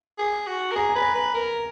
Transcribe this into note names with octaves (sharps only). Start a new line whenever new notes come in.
G#4
F#4
A#4
G#4 A#5
G#5
B4
A#5
B4
A#4